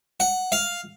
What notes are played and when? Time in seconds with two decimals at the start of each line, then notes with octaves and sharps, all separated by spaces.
0.20 F#5
0.52 F5